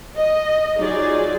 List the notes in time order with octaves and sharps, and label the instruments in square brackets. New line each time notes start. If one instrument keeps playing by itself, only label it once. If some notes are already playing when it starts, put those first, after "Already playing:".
[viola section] D#5
F#3 D#4 F4 G#4 D5